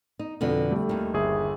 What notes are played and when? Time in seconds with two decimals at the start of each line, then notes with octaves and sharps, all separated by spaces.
0.19 D#4
0.41 F2 B2 D3
0.71 G3 A3
0.89 D#2 D#3
1.14 G1 G#4 E5